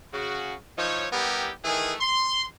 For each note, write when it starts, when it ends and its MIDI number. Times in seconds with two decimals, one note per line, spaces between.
0.14 0.55 49
0.14 0.55 66
0.78 1.07 53
0.78 1.07 63
0.78 1.07 64
0.78 1.07 73
1.12 1.50 55
1.12 1.50 59
1.12 1.50 64
1.12 1.50 67
1.12 1.50 70
1.65 1.95 51
1.65 1.95 52
1.65 1.95 57
1.65 1.95 68
2.00 2.45 84